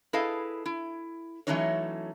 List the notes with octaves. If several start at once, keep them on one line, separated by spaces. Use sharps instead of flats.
E4 G#4 A4 B4 D#5 F5
E4
E3 F#3 A3 C#4 D#4 C#5